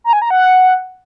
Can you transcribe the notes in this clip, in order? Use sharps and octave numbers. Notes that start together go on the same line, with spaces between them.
A#5
G#5
A#5
F#5